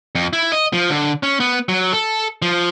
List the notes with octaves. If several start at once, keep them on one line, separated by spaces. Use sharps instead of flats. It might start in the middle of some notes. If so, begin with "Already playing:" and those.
F2
E4
D#5
F3
D3
C#4
B3
F#3
A4
F3